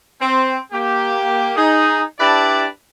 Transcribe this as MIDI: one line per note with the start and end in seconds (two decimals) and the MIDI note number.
0.21 0.56 60
0.72 1.51 58
0.72 1.51 67
1.57 2.02 63
1.57 2.02 68
2.19 2.65 62
2.19 2.65 64
2.19 2.65 67
2.19 2.65 71
2.19 2.65 74
2.19 2.65 81